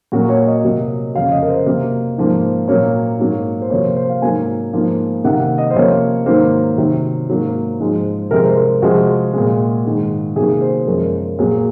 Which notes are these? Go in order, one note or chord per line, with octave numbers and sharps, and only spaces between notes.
A#2 F#3 A#3 F#4
C#5
D#5
C3 F#3 A#3
F2 C#3 F#3 F5
D#5
A#4
C5
C3 F#3 A#3
G#2 F3 A#3
A#2 F#3 A#3 C#5
G#2 F#3 A#3
C5
C3 F3 A#3 C#5
C5
C5
F5
G#2 F#3 A#3 G#5
G#2 F3 A#3
C3 D#3 A#3 F#5
D#5
C5
C3 F3 A#3 C#5
G#2 D#3 F#3 A#3 C5
C3 D#3 F#3
G#2 F#3 A#3
G#2 F3 G#3
C3 F3 G#3 A#4
C5
A#4
C3 F3 G#3 F#4
G#3
A#2
G#2 D#3 G#3
C3 D#3 F#3 A#3 G#4
C5
F#2 F3 G#3 A#4
A#2 F#3 A#3 G#4